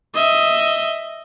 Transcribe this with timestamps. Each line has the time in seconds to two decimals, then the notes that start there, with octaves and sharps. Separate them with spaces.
0.14 D#5 E5